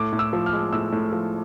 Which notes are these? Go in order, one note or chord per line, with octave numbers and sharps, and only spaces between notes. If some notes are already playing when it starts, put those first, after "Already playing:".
Already playing: A2 D6
A2
E6
F3
F6
G#3
A2 E6
A2
F3